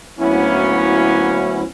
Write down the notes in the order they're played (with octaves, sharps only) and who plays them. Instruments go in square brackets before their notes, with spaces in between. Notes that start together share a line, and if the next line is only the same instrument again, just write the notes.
[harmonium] D2 F#3 E4 [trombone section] A#3 B3 C#4